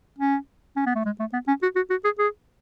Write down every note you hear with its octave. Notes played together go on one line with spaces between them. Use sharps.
C#4
C#4
B3
A3
G#3
A3
B3
C#4
F#4
F#4
F#4
G#4
G#4